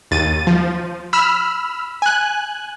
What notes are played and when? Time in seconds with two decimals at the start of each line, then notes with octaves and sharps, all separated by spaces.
0.11 D#2 A6 D#7
0.47 F3
1.13 B5 E6 F6
2.02 G#5 F#6